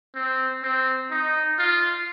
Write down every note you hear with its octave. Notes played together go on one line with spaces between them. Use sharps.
C4
C4
D#4
F4